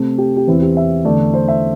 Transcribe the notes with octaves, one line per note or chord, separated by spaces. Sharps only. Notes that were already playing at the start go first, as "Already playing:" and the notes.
Already playing: C3 A3 C4
G4
G4
E2 E3 C4 E4
G4
E5
E2 D3 A3 D5
C5
E5